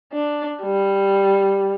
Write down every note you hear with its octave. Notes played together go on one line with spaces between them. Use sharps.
D4
G3